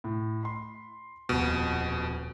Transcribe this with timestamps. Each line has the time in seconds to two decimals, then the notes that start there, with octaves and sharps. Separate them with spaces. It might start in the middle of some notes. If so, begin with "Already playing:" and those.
0.04 A2
0.43 B5 C6
1.29 D#1 F2 B2